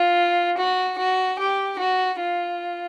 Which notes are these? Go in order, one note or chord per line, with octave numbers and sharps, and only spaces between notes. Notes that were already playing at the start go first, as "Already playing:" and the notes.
Already playing: F4
F#4
F#4
G4
F#4
F4